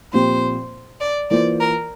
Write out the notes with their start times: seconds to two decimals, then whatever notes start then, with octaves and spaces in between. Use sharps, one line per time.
0.13 A#2 F3 C4 G4 C5
1.01 D5
1.30 E3 A#3 F4 C5 D5
1.60 A#4